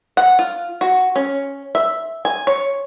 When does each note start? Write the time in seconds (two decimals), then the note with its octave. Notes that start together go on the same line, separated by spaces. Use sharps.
0.17 F#5
0.39 F4
0.81 F#4
1.16 C#4
1.75 E5
2.25 G#5
2.47 C#5